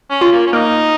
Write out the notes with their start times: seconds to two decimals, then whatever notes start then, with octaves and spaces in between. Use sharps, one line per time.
0.10 C#4
0.21 F4
0.32 A#3
0.46 C#4
0.53 A#3 D#4